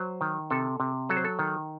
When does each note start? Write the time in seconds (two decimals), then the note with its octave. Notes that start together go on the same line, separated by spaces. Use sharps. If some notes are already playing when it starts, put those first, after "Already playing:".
Already playing: F#3 C5
0.21 D#3
0.50 C3 A4
0.80 C3
1.09 F#3 A4
1.17 C5
1.25 A4
1.39 D#3